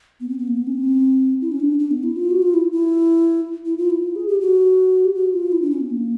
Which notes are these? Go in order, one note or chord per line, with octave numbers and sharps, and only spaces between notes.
B3
C4
B3
A#3
B3
C#4
C4
E4
C#4
D4
D4
B3
E4
F4
F#4
F4
E4
E4
E4
F4
E4
F4
G#4
G4
F#4
G4
F#4
F4
E4
D4
C#4
B3
A#3